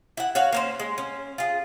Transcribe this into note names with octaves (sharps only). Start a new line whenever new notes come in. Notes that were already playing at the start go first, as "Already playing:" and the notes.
E4 F#5
F#4 C#5 F5
A#3 C#4 C5
G#3
C#4
F4 G#4